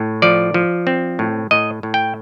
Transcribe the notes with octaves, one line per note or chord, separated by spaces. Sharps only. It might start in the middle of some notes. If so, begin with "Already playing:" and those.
Already playing: A2
F3 D5
F3
C4
A2
A2 D#5
A2
G5